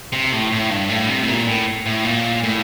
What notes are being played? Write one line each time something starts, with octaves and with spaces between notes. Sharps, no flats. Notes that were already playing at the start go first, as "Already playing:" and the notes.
C3
A2
A2
G2
A2
C3
A2
A#2
A2
A2
A#2
A2